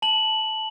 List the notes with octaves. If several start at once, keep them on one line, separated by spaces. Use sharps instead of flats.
A5 F#7